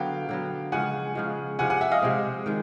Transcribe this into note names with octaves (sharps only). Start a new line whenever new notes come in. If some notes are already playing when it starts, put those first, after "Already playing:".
Already playing: D3 F#3 B3 F5 G5
D3 F#3 B3
C#3 F3 G#3 F#5 G#5
C#3 F3 G#3
C3 F3 G#3 C4 F#5 G#5
F#5 G#5
E5 F#5
D#5 F5
C3 F3 G#3 C4
D#3 G#3